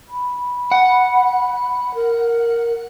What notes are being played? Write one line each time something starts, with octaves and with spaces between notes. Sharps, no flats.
B5
F#5
A#4